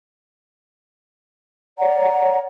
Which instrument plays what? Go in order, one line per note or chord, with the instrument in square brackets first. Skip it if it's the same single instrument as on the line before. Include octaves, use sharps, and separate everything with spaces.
[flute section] C#5 D5 F#5 A#5